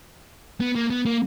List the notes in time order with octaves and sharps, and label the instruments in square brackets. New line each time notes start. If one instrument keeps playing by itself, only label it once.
[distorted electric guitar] B3
A#3
B3
A#3